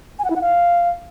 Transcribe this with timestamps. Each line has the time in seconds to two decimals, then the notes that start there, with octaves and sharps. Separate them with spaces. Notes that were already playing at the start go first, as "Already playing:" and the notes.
0.19 G#5
0.25 F#5
0.30 E4
0.36 F#5
0.41 F5